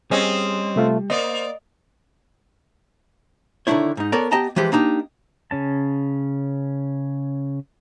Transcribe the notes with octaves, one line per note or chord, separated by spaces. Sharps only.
G3 C4 C#4 G#4 D#5
C3 A3 F4
A#3 C5 D5 D#5
D3 D#3 F#3 D4 E4 C#5
G#2 D#4
B3 A4 A#4 C#5 D5
B3 G4 D#5 G5 A5 A#5
E3 F3 G#3 G4 B4
A#3 D4 D#4 G4
C#3 C#4 A5